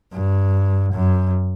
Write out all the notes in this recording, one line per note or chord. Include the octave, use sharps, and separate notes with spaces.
G2
F#2